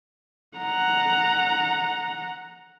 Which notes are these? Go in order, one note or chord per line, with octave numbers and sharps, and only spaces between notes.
F#5 A#5